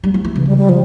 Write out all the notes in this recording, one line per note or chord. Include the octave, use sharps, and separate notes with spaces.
G3
F3
E3
C#3 E3
G3
G3
F3